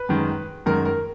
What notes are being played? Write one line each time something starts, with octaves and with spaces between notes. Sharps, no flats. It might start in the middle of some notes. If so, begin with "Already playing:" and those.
Already playing: B4
F#2 D#3 G#3
F#2 D#3 G#3 A#4
A#4